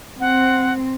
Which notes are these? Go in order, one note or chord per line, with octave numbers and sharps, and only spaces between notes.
C4 F#5